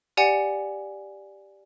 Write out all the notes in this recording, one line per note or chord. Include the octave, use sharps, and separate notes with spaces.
G4 D5 F#5 G#5 C#7